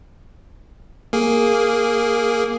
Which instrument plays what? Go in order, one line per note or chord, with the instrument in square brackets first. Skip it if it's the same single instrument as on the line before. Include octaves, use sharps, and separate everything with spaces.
[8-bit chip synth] A#3 G#4